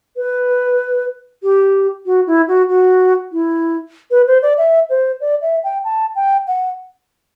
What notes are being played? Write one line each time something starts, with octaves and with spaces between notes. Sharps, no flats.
B4
G4
F#4
E4
F#4
F#4
E4
B4
C5
D5
E5
C5
D5
E5
G5
A5
G5
F#5